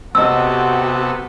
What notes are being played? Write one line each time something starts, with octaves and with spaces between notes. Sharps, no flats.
C3 B3 C4 F#4 G4 A4 D#5 E6